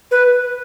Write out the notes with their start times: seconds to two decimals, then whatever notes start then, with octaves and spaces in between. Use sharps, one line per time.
0.11 B4